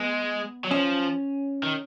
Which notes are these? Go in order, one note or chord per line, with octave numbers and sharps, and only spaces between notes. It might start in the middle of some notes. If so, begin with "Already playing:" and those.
Already playing: G#3 B3
F#3
F3 C#4
D#3